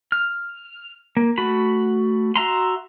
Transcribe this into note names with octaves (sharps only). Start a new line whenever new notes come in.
F6
A#3
A3 F#4 B5
F#4 E5 A#5 C6